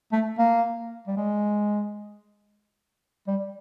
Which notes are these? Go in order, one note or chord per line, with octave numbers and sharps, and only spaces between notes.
A3
A#3
G3
G#3
G3